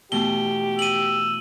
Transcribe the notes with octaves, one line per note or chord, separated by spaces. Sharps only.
B2 E3 A3 G4 G7
E6 D#7 F#7